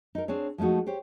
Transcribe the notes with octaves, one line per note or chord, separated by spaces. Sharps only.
D#4 A#4
C4 D4 G#4 C#5
F3 G#3 A3 D#4 F#4
G4 C5 C#5